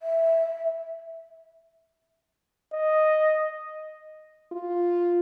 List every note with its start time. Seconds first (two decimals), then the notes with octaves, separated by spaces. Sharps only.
0.02 E5
2.73 D#5
4.52 F4